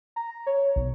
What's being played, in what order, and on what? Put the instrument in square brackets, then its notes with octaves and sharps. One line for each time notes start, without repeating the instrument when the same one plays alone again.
[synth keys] A#5
C#5
B1